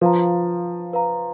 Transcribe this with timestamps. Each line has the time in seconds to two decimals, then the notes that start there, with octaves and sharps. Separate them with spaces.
0.01 F3 B4 F5 A#5
0.93 B4 F5 A#5